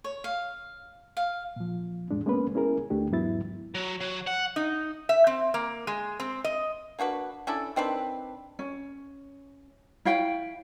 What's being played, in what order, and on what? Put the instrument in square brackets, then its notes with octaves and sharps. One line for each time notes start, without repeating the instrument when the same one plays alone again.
[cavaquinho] C#5
F5
F5
[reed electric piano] A#2 F3
E2 A2 G#3 D4
G#3 A#3 B3 C#4 B4
B3 C#4 E4 G#4 A#4
D2 A3 D4 G4
E2 G#2 F#3 B3 E4 A6
[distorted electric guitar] F#3
F#3
F#5
[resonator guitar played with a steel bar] D#4
E5
C4
A#3
G#3
C4
D#5
[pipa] A#3 D4 F#4 B4
C#4 D4 E4 A4
D#3 C4 D4 B4
[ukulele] C#4
E4 C#5 F5 G5